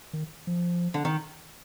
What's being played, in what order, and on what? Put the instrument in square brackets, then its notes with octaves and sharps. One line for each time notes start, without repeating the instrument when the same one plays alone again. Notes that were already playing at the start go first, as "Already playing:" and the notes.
[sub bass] D#3
F3
[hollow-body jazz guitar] D3
D#3